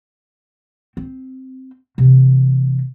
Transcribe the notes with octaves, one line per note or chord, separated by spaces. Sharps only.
C4
C3 E3